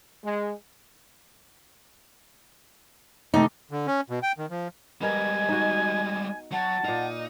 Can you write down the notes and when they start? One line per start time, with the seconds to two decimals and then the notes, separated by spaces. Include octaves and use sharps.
0.24 G#3
3.34 C3 D#3 A3 D#4
3.71 D3
3.87 C#4
4.10 B2
4.23 G5
4.38 D#3
4.50 F3
5.01 G3 G#3 B3 A#4 D#5 G#5
5.49 D#4 F#4
6.52 F#3 F#5 A5
6.84 A#2 D#4 F5